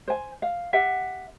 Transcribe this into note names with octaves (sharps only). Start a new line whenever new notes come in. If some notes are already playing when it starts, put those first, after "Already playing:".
C5 G#5
F5
G4 E5 F#5